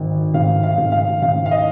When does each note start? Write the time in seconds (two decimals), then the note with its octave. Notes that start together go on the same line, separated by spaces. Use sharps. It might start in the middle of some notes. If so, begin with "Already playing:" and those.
Already playing: G#1 D#3
0.34 G#1 F5
0.63 F5
0.78 G#1
0.92 F5
1.22 G#1 F5
1.46 F5
1.51 D#5